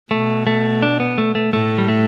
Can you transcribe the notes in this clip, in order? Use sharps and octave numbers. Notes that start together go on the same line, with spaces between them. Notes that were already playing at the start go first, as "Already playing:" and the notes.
B2 A3
A3
D4
B3
A3
A3
A2 A3
G3
A3